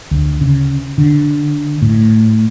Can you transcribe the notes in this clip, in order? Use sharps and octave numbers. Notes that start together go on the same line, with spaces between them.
D2
C#3
D3
A2